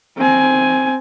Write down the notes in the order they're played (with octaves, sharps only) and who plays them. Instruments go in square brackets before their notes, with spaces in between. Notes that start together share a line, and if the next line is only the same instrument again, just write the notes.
[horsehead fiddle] C4 G#5